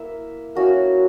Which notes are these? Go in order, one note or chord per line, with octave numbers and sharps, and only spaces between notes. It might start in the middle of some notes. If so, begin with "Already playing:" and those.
Already playing: A#3 E4 E5
A#3 C#4 E4 F#4